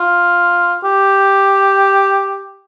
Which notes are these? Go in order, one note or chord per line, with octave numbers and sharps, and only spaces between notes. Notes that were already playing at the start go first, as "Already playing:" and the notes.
Already playing: F4
G4